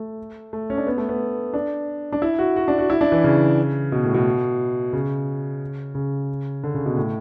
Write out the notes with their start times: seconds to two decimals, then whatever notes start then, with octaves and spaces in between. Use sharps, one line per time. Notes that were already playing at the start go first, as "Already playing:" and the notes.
Already playing: A3
0.53 A3
0.70 C#4
0.78 D4
0.87 B3
0.98 A3
1.09 B3
1.53 D4
2.12 D4
2.22 E4
2.39 F#4
2.56 F#4
2.68 D4
2.79 F#4
2.90 E4
3.01 D4
3.12 E3
3.24 C#3
3.92 B2
4.03 A2
4.14 B2
4.93 C#3
5.95 C#3
6.64 D3
6.74 C#3
6.86 B2
6.97 A2